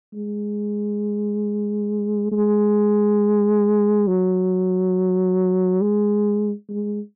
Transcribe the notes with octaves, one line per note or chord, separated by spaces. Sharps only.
G#3
G#3
F#3
G#3
G#3